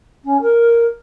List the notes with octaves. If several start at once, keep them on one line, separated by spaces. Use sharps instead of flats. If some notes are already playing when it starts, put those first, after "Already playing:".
C#4
A#4